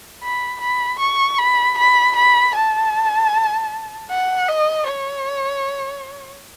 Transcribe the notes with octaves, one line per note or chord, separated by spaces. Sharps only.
B5
B5
C#6
B5
B5
B5
A5
F#5
D#5
C#5